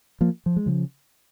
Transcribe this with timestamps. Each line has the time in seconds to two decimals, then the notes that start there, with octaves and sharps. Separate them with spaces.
0.21 F3 A#3
0.46 F3
0.56 G#3
0.66 C#3 F3